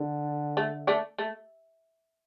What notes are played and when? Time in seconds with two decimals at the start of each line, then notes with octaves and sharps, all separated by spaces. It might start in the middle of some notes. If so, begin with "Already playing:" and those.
Already playing: D3
0.57 A3
0.87 A3 D4
1.18 A3